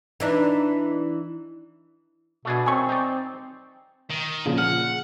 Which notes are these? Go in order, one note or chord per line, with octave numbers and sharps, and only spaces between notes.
E3 D4 D#4
B2 A3 D4 G#4
F#2 A2 A3 C4 G#5 C#6
D#4 D5
D#3
A#2 C#3 F3
F#5 F6